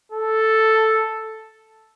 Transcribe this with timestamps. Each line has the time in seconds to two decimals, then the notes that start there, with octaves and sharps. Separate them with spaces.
0.12 A4